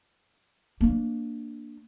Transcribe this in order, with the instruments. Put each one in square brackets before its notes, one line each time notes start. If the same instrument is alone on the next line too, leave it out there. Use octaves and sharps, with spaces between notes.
[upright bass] A#3 D4